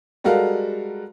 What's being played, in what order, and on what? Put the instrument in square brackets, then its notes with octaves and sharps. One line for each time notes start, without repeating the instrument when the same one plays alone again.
[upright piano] G3 G#3 F#4 A4 A#4 F5